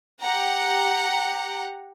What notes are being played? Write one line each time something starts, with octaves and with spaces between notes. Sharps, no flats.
G4 F#5 A#5